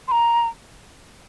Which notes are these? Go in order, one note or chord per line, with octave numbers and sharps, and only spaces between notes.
C6
A#5